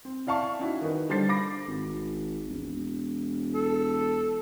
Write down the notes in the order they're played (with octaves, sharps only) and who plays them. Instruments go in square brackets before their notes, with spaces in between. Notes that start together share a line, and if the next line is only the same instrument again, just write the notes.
[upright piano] C4
E4 D5 F5 A5 C#6
C#4 D#4 E4 F#4
D#3 D#4 B4
D3 G3 D4 C5 A6 C7
B5 D6 A#6
[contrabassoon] G#1
E1
[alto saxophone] A4